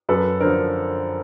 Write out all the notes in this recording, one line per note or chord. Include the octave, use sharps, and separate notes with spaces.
F#2 A4 B4
D3 F3 A#4 C5